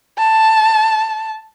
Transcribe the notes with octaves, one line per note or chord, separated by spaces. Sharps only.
A5